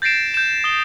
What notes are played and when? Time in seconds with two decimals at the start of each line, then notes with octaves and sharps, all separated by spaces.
0.02 G6 A6 A#6 C7 D7 E7
0.34 G6 E7
0.64 D#6 G7